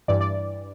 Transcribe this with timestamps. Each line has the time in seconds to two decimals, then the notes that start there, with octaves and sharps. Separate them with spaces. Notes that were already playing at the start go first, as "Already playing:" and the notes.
0.08 G2 E3 D5
0.21 D5